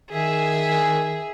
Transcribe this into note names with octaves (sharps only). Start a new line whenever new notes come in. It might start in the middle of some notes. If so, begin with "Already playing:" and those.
D#3 G#4 E5